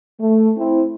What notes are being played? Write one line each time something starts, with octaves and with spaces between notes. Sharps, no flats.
A3
C4 E4